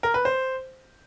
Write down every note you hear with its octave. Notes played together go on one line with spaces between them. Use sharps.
A#4
B4
C5